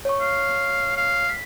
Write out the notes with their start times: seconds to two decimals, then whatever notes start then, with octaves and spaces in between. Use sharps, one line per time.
0.05 C#5 C#6
0.21 F5
0.97 F5
1.29 B6